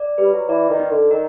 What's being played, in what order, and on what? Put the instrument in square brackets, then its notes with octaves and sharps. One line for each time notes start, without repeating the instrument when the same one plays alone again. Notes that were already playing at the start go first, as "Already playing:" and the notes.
Already playing: [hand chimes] D5
[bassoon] G3 [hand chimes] B4
[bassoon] F#3
[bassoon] E3 [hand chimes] D5
[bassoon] D#3
[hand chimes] D#4
[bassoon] D3
[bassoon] D#3 [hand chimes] A#4